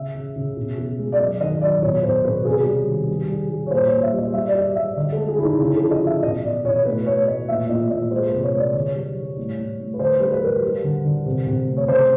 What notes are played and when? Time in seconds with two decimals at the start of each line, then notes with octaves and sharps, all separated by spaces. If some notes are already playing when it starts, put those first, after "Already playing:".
Already playing: C#3 E5
0.14 C#3
0.36 C#3
0.57 B2
0.78 B2
0.99 G#3
1.12 D5
1.20 F#3 D#5
1.41 D#3 D#5
1.61 F#3 D5
1.82 B2 C#5
2.03 B2 C5
2.24 B2 B4
2.45 C3 G#4
2.66 G3
2.87 D#3
3.08 G3
3.29 G3
3.50 G3
3.66 C#5
3.71 A#2 C5
3.87 A#2 C#5
4.03 E5
4.13 G3
4.18 D#5
4.33 G3 E5
4.47 D5
4.55 G3 D#5
4.75 G3 E5
4.96 D3 D#5
5.12 A4
5.18 G#3
5.28 G#4
5.38 D3 E4
5.44 D#4
5.59 C#3 E4
5.76 A4
5.81 F3
5.91 D#5
6.02 F3 E5
6.23 B2 D#5
6.43 B2 D5
6.64 B2 C#5
6.85 A2 B4
7.06 A2 C#5
7.27 A3 D#5
7.48 A#2 E5
7.69 A#2 D#5
7.90 A#2 D#5
8.11 G#3 C5
8.27 C3 B4
8.43 C#5
8.53 G#3 D5
8.74 D3 C#5
8.95 G3
9.16 G3
9.37 A2
9.58 A2
9.79 A2
9.94 B4
9.99 D3 C5
10.20 G3 B4
10.32 B4
10.42 G3 A#4
10.63 G3
10.84 D3
11.05 D3
11.26 C3
11.47 C3
11.67 A3
11.77 C#5
11.88 C#3 C5